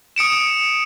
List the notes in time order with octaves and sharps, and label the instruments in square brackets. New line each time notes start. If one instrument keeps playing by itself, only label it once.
[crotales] D#6 C#7 D7 E7